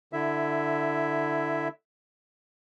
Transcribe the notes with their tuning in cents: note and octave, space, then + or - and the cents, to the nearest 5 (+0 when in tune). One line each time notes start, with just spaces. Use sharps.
D3 +15 E4 +15 E5 +0